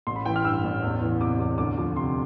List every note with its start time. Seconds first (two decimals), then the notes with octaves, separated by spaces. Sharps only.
0.07 A1 C6
0.16 B5
0.26 E3 G5
0.36 F6
0.44 G2 E6
0.64 A1
0.82 E2
1.01 E3
1.20 C3 D6
1.39 E2
1.58 D2 D6
1.78 F3
1.96 C3 C6